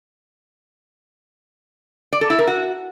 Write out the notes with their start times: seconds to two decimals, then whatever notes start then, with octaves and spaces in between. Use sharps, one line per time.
2.13 D5
2.21 A4
2.30 E4
2.39 A#4
2.47 F#4